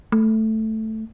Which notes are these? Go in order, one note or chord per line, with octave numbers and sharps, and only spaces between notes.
A3